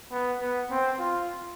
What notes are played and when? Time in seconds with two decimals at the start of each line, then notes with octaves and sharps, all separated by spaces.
0.12 B3
0.41 B3
0.71 C4
0.99 F4